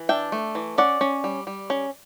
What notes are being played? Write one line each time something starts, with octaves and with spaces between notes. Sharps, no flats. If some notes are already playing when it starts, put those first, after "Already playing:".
Already playing: E3
D4 E5 G5
A3
E3
C#4 D5 F#5
C#4
G3
G3
C#4